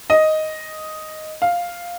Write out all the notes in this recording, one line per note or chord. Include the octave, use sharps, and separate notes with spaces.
D#5
F5